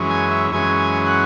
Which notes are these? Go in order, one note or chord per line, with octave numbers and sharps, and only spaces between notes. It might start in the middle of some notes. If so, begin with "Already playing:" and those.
Already playing: F#2 E3 G#3 C#4
G#5
E5
F#2 E3 G#3 C#4 G#5
G#5
F#5